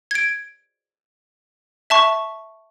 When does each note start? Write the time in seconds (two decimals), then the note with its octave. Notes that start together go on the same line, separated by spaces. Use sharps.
0.11 G#6 D7
1.90 E5 A5 C#6